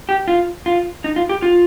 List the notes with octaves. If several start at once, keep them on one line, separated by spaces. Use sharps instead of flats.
G4
F4
F4
D#4
F4
G4
F4